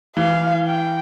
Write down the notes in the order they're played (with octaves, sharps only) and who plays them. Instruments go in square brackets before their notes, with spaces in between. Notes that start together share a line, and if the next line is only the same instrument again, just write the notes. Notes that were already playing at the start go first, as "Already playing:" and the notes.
[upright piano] E3 [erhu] F5
[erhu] G5